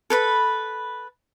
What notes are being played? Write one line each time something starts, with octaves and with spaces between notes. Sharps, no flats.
A4 B4 B5